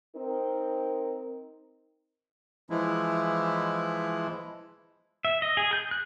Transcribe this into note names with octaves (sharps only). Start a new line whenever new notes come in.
C4 D#4 A#4
E3 F3 G#3 E4
E5
D#5
G#4
G6
F#6